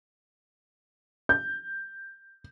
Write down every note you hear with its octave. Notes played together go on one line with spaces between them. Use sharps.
G6